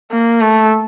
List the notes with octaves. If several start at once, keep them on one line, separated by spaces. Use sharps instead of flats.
A#3
A3